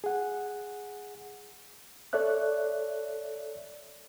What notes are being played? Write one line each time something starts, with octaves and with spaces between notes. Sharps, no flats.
G#4 F#5
A4 C#5 D5 E5 F#6